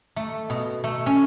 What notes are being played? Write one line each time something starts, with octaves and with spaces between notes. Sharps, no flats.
A3
B2
A3
C#4